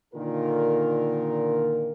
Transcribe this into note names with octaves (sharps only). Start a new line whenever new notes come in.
A#2 D3 D#3 F4 A4 A#4